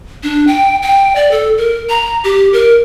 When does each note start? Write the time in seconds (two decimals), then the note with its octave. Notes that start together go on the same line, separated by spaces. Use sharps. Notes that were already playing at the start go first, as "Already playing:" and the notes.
0.23 D4
0.47 G5
0.82 G5
1.16 D5
1.31 A4
1.58 A#4
1.89 A#5
2.24 G4
2.53 A#4